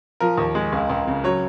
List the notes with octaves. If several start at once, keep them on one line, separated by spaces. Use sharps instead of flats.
F3 A#4
D#2
G#3
C#2
C#2
C#3
F#3 C#5